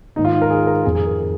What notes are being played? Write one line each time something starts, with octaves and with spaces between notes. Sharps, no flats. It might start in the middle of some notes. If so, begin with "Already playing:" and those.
G#2 D#3 D#4
F4
A#4
G#4
A#4
F2 D#3 G#4
G#4
A#4
G#4